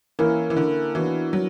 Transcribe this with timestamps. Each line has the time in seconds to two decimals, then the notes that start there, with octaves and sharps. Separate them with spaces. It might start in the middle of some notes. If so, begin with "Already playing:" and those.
0.19 E3 A#3 C#4 E4 A#4
0.50 E3
0.57 D3
0.95 E3 B3 D4 F#4 A#4
1.33 F#3